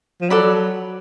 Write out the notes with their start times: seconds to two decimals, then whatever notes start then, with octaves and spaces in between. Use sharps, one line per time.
0.21 F3
0.30 F#3 A4 D5 F#5 B5